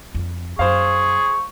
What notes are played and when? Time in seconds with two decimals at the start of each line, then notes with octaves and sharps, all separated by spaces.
0.15 F2
0.59 F#2 G#4 C5 F5 C#6